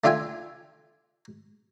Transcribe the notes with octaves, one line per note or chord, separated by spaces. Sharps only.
A3 D4 F4 E5 G5 G#5